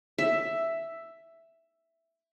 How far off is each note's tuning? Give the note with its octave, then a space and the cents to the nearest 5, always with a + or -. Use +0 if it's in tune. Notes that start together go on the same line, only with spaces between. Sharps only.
E5 +5